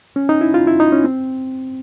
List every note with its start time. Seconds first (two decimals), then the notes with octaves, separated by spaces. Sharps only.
0.16 C#4
0.29 D#4
0.41 E4
0.54 F4
0.67 E4
0.80 D#4
0.92 C#4
1.04 C4